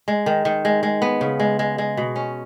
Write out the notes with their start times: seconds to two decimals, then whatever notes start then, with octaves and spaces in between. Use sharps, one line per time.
0.08 G#3
0.26 D#3
0.45 D#3
0.65 G#3
0.83 G#3
1.02 B3
1.21 C#3
1.40 G#3
1.59 G#3
1.78 G#3
1.97 B2
2.16 C#4